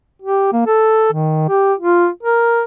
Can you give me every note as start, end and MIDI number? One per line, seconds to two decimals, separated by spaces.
0.22 0.49 67
0.52 0.62 58
0.67 1.10 69
1.12 1.45 51
1.49 1.74 67
1.79 2.08 65
2.23 2.63 70